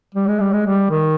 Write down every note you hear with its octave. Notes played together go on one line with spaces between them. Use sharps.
G3
G#3
G3
G#3
G3
D#3